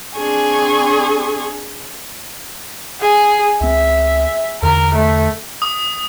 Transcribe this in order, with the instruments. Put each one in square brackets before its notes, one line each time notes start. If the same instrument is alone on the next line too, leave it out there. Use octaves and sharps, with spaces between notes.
[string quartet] C4 D4 G#4 G#5 C#6
[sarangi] G#4
[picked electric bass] C#2 C4 [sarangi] E5
[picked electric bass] E2 D3 [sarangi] A#4
[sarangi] A3
[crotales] D#6